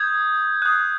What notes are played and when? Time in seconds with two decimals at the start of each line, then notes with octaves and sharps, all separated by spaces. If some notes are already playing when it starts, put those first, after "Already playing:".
Already playing: D#6 G6 G#6
0.62 D#6 F#6